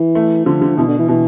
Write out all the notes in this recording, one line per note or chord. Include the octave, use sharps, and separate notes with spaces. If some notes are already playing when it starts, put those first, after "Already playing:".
Already playing: E3
A3
D3 F3
D3
B2 E3
D3
E3
B2 E3